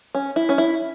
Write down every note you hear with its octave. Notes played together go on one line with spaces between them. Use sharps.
C#4
E4
C#4
E4